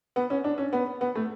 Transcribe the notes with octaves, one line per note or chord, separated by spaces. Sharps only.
B3
C#4
D4
C#4
B3
B3
A3